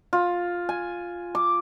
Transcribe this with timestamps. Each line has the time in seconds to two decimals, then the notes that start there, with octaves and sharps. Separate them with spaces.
0.13 F4
0.69 G#5
1.35 D6